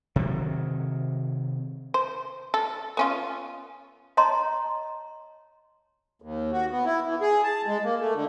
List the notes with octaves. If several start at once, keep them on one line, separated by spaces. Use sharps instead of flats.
C3 D#3 F#3
C5
A4
B3 C#4 F4
C#5 D#5 A5 A#5 C6
D#2
F#4
B3
E4
E3
G#4
A5
G#3
A#3
A3
D3